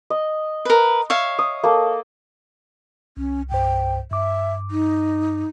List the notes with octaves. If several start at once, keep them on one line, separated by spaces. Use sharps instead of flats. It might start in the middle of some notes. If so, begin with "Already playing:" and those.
D#5
A#4 B4
C#5 E5 F5
D#6
A#3 A4
C2 C#4
C2 G2 C5 G5
G2 E5 D6
D#4